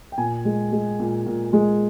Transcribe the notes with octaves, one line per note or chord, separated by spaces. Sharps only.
G5
A#2 G#5
G#3
G#3
A#2
A#2
G#3